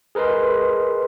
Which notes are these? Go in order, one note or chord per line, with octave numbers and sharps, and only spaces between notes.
G#4 A#4 B4 D#5 C6